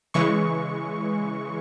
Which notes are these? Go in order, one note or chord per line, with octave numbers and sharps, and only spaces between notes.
C#3 E3 G#3 C#6